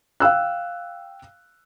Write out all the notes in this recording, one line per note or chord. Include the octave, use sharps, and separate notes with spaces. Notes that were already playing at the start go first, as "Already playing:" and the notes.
F5 G5 E6 F#6